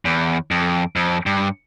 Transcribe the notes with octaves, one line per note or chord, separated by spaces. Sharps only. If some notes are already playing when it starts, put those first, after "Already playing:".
E2
F2
F2
G2